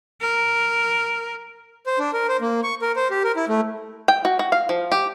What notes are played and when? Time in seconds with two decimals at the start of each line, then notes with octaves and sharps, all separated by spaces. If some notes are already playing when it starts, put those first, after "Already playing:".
0.21 A#4
1.86 C5
1.99 D4
2.13 A#4
2.29 C5
2.41 A#3
2.64 C#6
2.82 A#4
2.96 C5
3.10 G4
3.24 A#4
3.36 E4
3.48 A3
4.08 G5
4.25 F#4
4.39 F#4
4.52 F5
4.69 F3
4.92 G4